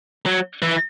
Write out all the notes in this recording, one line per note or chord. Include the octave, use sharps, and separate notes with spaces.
F#3
E3